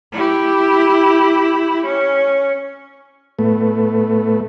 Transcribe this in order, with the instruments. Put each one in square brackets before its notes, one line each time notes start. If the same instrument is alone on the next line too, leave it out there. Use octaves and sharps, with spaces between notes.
[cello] E4 G4
C#4
[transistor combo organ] A2 A3 B3